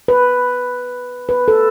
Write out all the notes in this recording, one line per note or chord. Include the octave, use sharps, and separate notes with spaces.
B4
B4
A4